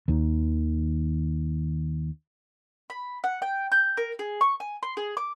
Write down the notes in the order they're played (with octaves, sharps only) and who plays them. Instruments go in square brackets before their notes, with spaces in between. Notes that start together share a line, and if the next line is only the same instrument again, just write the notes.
[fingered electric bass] D#2 D#3
[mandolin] B5
F#5
G5
G6
A#4
G#4
C#6
G#5
C6
G#4
D6